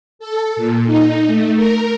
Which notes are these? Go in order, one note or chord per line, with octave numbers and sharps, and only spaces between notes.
A4
A#2
D#4
A3
A#4